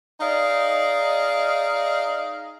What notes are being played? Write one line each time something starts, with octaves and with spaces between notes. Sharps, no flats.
D#4 G#4 D5 D#5 F5